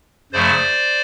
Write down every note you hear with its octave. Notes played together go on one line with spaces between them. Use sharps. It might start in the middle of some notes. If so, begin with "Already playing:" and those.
F#2 C#3 F3 A3 C5 D5